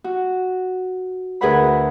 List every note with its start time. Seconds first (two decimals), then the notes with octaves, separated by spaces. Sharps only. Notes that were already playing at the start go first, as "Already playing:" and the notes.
0.04 F#4
1.41 D2 G#4 A#4 B4 F#5 B5